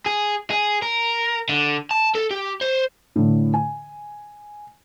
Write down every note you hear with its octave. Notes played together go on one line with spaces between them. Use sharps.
G#4
G#4
A#4
D3
A5
A4
G4
C5
A2 D3
G#5